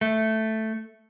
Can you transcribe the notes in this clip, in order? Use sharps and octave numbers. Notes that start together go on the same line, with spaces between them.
A3